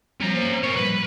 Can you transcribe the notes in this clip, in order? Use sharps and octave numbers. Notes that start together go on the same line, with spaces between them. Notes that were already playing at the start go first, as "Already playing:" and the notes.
F3 G3 C#4 A#5
A#3 C5
A#4 C#5
A2 F3 G3 B4